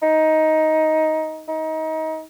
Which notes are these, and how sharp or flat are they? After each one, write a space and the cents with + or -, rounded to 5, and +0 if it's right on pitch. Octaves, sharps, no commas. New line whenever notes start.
D#4 +15
D#4 +25